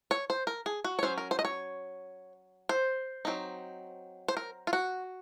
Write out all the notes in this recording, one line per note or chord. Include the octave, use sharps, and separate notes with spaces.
C#5
C5
A#4
G#4
F#4
C#5
F#3 C#4 C5
A#4
C5
D#5
C#5
C5
F#3 C4 D#4
C5
A#4
F4
F#4